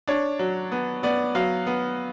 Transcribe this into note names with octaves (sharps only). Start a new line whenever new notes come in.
D4 C#5
F#3
B3
B3 D5
F#3 F5
B3